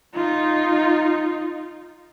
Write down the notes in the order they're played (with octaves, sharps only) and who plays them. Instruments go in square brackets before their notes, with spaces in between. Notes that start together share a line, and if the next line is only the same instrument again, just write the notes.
[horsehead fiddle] D#4 F4